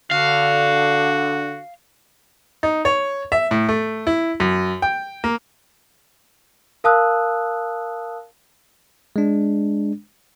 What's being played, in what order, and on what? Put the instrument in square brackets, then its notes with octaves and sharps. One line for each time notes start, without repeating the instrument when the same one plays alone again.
[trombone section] D3 [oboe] F#4 [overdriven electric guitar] F5
[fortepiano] D#4
C#5
E5
A2
A3
E4
F#2
G5
A#3
[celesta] A#4 F5 A5 D#6 E6 F#6
[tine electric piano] G#3 D4